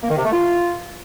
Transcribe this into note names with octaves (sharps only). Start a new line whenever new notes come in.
A#3
D#3
C3
A3
F4